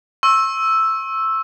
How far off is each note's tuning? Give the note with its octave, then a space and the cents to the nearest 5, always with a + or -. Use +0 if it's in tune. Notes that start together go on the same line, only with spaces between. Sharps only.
C#6 -40 E6 +0